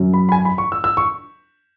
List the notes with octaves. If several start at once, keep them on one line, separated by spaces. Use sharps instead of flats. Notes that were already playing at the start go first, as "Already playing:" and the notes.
Already playing: F#2 F#3 C#4
B5
B5
G#5
B5
C#6
E6
E6
C#6